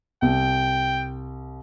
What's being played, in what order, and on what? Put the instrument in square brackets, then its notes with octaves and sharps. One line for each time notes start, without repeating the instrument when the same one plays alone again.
[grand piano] C2 [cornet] G5